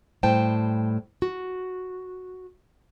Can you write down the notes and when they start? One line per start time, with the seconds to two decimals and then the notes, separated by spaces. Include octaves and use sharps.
0.23 A2 G3 C5 G5 A5
1.22 F#4